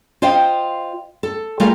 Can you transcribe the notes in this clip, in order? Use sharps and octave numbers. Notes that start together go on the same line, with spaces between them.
F4 C5 D#5 F5 G5
A4
G3 A3 F4 G#4 A#4 F5